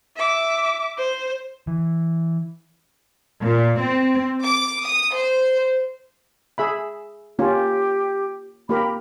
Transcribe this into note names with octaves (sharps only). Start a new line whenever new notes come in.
E5 D6
C5
E3
A#2
C4
D6
D#6
C5
G#4 E5 B5
A#3 C#4 F4 G4
A#3 G4 A#4 B5